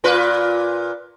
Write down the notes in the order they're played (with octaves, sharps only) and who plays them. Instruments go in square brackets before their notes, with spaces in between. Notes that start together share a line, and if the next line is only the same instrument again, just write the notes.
[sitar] A#2 F4 B4